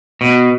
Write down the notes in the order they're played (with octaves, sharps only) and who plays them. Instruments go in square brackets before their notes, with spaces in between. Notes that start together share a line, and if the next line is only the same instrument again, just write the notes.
[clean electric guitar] B2